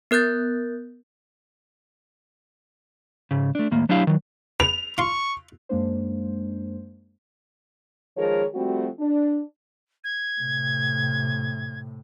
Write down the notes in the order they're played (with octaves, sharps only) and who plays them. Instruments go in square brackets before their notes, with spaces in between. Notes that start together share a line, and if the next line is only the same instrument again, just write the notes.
[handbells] B3 A#4 F#6 G6 A6
[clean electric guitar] G#2 C#3
A3 D4
D#2 A2 A#3
F#3 D4 E4 G4 F5
D#3 F#3
[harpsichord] B4 [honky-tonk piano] F7
[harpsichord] F4 C6 [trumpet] C#6
[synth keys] F#2 G#3 A#3 D4 C5
[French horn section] D#3 F3 G#3 G#4 A#4 C#5
F3 G3 A3 C4 F#4
D4
[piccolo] G#6
[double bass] A2 C3